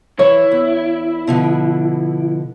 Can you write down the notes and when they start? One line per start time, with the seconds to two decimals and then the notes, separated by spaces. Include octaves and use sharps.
0.19 E3 E4 C#5
0.51 E2
1.27 B2 D3 F3